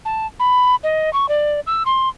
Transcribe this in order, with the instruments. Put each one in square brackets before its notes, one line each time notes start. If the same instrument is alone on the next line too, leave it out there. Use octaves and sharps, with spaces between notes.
[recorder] A5
B5
D#5
C#6
D5
E6
C6